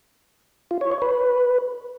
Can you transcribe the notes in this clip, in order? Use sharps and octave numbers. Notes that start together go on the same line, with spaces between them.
F4
C#5
C#5
B4